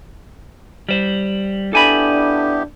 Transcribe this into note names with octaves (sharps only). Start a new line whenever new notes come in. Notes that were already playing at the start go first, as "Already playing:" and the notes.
G3 C5
B3 D4 E4 G4 A4 G#5 B5